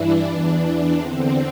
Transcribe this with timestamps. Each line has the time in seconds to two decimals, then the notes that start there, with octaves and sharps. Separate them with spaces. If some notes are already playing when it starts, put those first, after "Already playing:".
Already playing: G2 E3 D4 E4
0.25 E2 E3 D4
0.96 E2 D3 C4